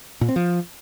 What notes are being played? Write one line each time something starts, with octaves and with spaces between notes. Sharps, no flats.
A#2
C4
F3